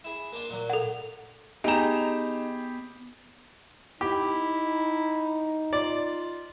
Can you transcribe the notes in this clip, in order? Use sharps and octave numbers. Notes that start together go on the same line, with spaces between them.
E4 G#4
A#3 D4 F4
A#2 F#3
A4 F#5
B3 D#4 G4 G#4 A#5 E7
D#4 E4 G4
F4 D5